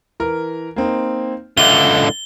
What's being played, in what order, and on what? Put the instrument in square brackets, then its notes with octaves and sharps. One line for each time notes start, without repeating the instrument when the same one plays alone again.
[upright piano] E3 A#4
A#3 C4 D#4
[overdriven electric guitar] C#2 D3 [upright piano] E5 [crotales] G7